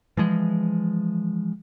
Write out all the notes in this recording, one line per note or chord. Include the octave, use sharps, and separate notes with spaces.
E3 F3 G#3